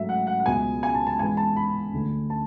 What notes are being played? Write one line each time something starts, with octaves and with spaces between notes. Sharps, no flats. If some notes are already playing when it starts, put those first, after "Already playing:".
Already playing: G#2 F#3 A3 E5
F#5
F#5
F#5
C#2 B2 G#3 B3 G#5
G#5
A5
A5
G#2 E3 G#3 B3 G#5
A5
B5
D2 D3 A3
A5